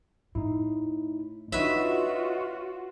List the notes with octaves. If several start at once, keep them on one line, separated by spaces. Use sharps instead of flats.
A2 D#4 E4
D4 D#4 F4 F#4 B4 C#5 D#5 E5